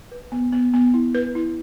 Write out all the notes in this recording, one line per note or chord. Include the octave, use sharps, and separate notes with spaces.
B4
B3
B3
B3
E4
B4
E4